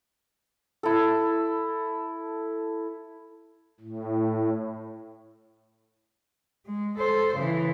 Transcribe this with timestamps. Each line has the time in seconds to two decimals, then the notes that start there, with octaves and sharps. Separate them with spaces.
0.83 E4 A4
3.80 A2
6.66 G#3
6.98 A4 C5
7.36 C#3 E3